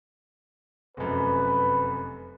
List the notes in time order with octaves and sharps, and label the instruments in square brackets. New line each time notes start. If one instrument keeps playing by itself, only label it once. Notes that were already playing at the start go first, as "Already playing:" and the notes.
[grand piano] F1 F#2 [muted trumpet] B4